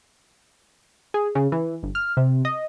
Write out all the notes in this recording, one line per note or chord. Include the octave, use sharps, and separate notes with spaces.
G#4
C#3
E3
G1
F6
C3
D#5